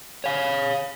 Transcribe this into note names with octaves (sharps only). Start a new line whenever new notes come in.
C#5 F5